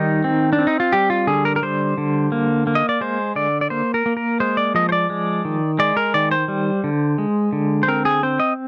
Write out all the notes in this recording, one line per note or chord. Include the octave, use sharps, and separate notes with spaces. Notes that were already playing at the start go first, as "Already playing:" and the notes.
Already playing: D#3 G3 D#4
C4
D4
C4
D#4
F4
G3 G4
F4
D3 G#4
A#4
A#4
G3 C5
D3
A#3
A#3
D#5
D5
G#3 C5
D3 D5
D5
A#3 C5
A#4
A#3
A#4
G#3 C5
D5
F3 D#5
C5
D5
G#3
D#3
G#3 D5
A#4
D#3 D5
C5
G3
D3
G#3
D3
C5
C4 A#4
G#4
C4 C5
D#5